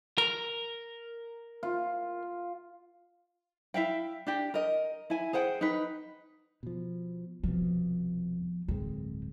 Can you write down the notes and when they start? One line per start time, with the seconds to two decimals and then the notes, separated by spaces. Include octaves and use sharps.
0.18 A#4
1.63 F4
3.74 E4 E5 F5 G5
4.26 D4 G4 G5
4.54 A#4 D#5
5.10 E4 G#5
5.33 G#4 C5 F#5 G5
5.61 D#4 B4
6.63 B2 F3
7.43 F1 C2 B2 F3
8.68 D1 G1 G#3 C4